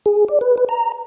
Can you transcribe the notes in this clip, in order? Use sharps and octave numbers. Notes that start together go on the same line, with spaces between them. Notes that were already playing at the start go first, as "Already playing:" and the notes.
G#4
D5
B4
B4
A#5